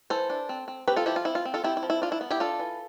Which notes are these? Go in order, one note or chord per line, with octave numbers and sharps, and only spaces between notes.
E3 A4 C5
D4
C4
C4
C4 G4 B4
F4 A4
F3 E4 G4
F4
C4 E4
F4
C4
F4 A4
C4 E4 G4
E4
F3
E4
D4 F4
E4
B3
E4 G4
D4 F4 A4
E3